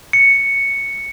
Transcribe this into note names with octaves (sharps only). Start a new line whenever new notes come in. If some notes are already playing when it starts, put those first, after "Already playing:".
C#7